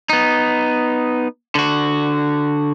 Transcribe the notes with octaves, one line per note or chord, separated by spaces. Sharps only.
B3 D#4
D3 F#4